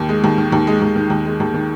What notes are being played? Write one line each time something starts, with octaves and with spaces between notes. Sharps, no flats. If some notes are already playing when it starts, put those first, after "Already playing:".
Already playing: D#2 D#3
G#3
D#2
D#3
D#2
G#3
D#2
D#3
D#2
G#3
D#2
D#3